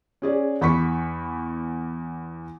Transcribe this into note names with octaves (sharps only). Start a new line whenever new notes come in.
C#4 G#4 D5
E2 B5 C#6 B6